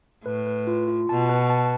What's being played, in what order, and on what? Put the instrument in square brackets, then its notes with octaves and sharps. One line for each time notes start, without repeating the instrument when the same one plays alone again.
[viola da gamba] A2 [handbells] B4
[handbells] B4
F4
F4
[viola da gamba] B2 [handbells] A5
[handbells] B4
A5